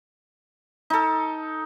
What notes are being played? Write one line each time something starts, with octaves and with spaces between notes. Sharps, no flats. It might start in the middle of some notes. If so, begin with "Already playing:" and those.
D#4 A4